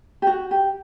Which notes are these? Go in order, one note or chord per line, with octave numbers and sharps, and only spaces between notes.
G4
F#4
G4